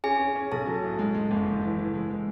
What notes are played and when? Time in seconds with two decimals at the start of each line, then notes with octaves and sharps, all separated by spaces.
0.04 C#4 G#4 G#5
0.19 C#4
0.36 C#4
0.52 B1 A4 A5
0.67 F#3
0.83 A2
0.99 G#3
1.15 G#3
1.31 F#1
1.46 F#1
1.62 E3
1.79 E3
1.94 G#3
2.10 G#3